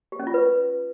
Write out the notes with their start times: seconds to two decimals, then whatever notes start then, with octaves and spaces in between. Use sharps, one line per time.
0.12 G4
0.19 C#4
0.27 F4
0.34 B4